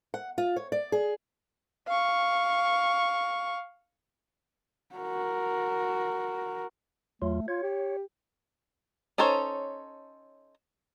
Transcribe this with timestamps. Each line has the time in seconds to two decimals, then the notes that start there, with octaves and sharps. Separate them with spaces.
0.14 F#5
0.38 F4
0.56 C#5
0.72 D5
0.92 G#4
1.87 F5 C#6
4.95 F#4 A#4
7.22 E2 F#3 A3 F4
7.48 F4 C#5
7.63 G4
9.18 C#4 D#4 A4 C5 C#5